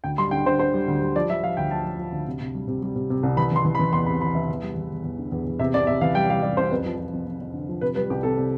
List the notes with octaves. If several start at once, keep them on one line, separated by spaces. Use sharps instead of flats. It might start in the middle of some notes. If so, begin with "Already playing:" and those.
D2 G5
G3 C6
D3 G5
D3 C5
D3 C5
G3
D2
G3
F3 D5
F3 E5
F3 F5
D2 G5
F3 A5
F3
F3
D2
C3
C3
G3
C3
G3
C3
C3
C2
E3 B5
E3 C6
E3
B5
E3
E2 C6
C3 B5
E2 B5
E3 E5
E2
G3
E2
E2
E2
D3
E2
E2
C3 E5
C2 D5
C3 E5
E3 F5
G3 G5
G3 F5
G3 D5
C2 C5
F2 B4
F3
F3
F2
F2
F2
D3
F3
C3 B4
G3 B4
C2 G4
C3 A4
C3